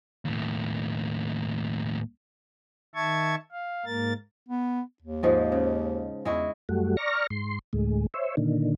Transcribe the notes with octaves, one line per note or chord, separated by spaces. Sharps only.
D#2 A2
D#3 E5 A5 C#6 G#6
F5
G#2 A#3 A#4 A6
B3
D#2
G#2 F3 G#3
C#3
E2 G#3 E4 F#4
F#2 G3 A3 F#4
D5 A#5 C#6 F6 A#6
G#2 C6
D2 A2 G#3
C5 C#5 E5
A#2 D3 D#3